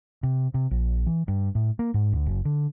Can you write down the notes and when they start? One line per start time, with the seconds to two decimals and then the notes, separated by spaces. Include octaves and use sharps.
0.23 C3
0.54 C3
0.71 A#1
1.06 E3
1.28 G2
1.55 A2
1.79 A#3
1.94 G#2
2.12 D2
2.26 F#1
2.45 D3